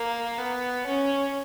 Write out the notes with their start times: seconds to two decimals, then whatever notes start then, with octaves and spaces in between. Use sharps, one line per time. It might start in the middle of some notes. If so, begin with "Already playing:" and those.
Already playing: A#3
0.38 B3
0.86 C#4